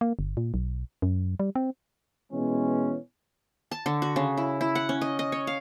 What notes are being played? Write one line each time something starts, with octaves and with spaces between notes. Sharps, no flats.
A#3
G1
A#2
B1
F#2
G3
C4
B2 E3 G#3 C#4
A5
D3
F#4
C#3
E4
E4
F#5
C#4
D#5
D#5
C#5
F5